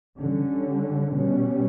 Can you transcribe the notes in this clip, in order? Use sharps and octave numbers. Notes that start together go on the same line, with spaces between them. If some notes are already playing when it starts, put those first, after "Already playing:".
D3 G3 C#4
B2 G3 C#4